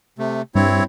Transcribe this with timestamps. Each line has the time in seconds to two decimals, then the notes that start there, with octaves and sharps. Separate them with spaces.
0.19 C3 A3
0.55 G2 C4 E4 C#5